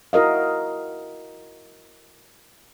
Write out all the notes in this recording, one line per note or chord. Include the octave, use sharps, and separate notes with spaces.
E4 F#4 A#4 D#5 F5